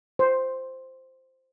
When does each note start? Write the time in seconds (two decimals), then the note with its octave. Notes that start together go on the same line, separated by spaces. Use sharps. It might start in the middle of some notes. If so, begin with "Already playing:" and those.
0.19 C5